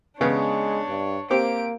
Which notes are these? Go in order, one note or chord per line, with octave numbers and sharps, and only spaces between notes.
C#3 G#3 B3 D4 C#5
G2
A#3 C4 G4 D7